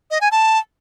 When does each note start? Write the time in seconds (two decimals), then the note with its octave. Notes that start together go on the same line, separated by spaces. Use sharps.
0.11 D#5
0.21 G#5
0.31 A5